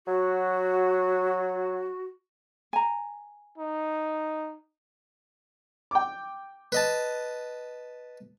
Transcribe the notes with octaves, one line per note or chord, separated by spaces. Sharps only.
F#3 F#4
G#5 A#5
D#4
G5 D6
B4 D#5 A5